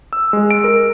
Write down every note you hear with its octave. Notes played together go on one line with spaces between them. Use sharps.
E6
G#3
D7
A#4